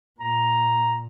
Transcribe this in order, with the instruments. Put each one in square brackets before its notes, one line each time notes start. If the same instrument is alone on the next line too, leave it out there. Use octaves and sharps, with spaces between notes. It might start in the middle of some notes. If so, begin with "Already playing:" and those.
[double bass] A#2 [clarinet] A#5